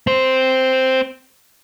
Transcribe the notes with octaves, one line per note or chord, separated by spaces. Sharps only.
C4 C5